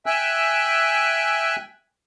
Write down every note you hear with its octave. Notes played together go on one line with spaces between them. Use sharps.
E5 G5 G#5 E6 F#6